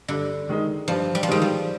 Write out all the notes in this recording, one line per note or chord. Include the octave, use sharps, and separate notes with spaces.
G2 D3
D#3 G#3 D#4
G2 F3
G3
F3
D#3 G3 G#3 D#4
F3